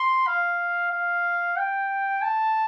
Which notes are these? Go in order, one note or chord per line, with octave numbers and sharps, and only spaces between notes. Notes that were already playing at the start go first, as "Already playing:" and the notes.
Already playing: C6
F5
F5
G5
A5